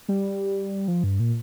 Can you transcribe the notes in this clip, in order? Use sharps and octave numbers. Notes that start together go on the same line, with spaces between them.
G3
F3
G2
A#2